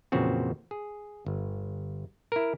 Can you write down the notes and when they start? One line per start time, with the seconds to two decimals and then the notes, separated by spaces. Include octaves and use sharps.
0.12 F2 A#2 C#3 E3 C4 F#4
0.71 G#4
1.26 G1
2.32 E4 A#4